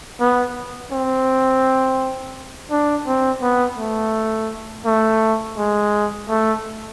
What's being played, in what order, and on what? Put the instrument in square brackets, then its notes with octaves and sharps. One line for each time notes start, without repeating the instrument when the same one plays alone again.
[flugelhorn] B3
C4
D4
C4
B3
A3
A3
G#3
A3